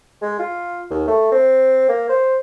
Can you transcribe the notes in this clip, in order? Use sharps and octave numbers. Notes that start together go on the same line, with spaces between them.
G#3
F4
D#2
A3
C4
A#3
C5